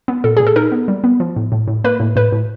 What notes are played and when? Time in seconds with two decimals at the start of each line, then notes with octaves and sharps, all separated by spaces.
0.08 B3
0.24 A#2 A4
0.37 A#2 G#4
0.47 A4
0.56 D#4 A#4
0.72 B3
0.88 G3
1.04 B3
1.20 F3
1.36 A2
1.52 A2
1.68 A2
1.84 A#3 B4
2.00 A2
2.16 A2 B4
2.32 A2